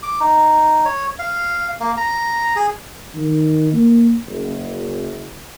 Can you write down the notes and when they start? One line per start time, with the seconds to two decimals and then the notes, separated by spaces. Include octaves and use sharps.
0.03 D6
0.20 D#4
0.85 C#5
1.19 F5
1.80 A#3
1.97 A#5
2.56 G#4
3.15 D#3
3.73 A#3
4.26 F#1